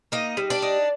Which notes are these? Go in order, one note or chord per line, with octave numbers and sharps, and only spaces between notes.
A#3 D#4 D#5
G3
D4 D5
D#4